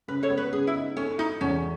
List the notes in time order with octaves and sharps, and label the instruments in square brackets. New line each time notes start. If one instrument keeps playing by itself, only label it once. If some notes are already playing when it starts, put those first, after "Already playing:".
[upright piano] C#3 [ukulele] B4
[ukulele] A4 C#5
[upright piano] B3
[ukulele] B4
[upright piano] C#3 [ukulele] G#4
[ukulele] E4
[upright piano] D#4
[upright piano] A3 [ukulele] C#4
[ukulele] D#4 [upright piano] E4
[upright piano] E2 [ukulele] C#4